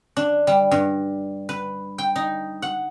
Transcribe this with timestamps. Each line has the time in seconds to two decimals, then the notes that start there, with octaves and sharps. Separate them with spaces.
0.17 D4
0.47 G3
0.71 G2
1.49 B4
1.98 G5
2.16 D#4
2.62 F#5